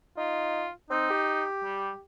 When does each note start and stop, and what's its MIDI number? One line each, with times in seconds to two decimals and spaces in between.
0.17 0.64 63
0.17 0.70 65
0.90 1.06 60
0.90 1.45 63
1.10 2.02 67
1.63 1.91 55